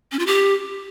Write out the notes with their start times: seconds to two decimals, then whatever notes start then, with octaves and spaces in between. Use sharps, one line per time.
0.12 C#4
0.19 F4
0.26 G4